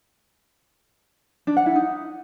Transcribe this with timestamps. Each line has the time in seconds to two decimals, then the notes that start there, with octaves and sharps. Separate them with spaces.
1.47 D4
1.57 F#5
1.66 E4
1.76 D#4